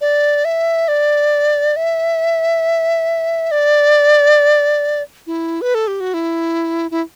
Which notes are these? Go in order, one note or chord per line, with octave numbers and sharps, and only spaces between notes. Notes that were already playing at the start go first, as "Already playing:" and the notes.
D5
E5
D5
E5
D5
E4
B4
A4
G4
F#4
E4
E4